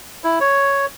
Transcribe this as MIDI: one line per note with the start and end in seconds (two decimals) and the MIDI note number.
0.24 0.39 64
0.40 0.86 73